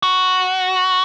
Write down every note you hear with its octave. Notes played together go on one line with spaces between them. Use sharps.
F#4